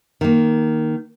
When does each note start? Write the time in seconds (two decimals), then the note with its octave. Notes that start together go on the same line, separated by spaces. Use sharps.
0.21 D#3 A#3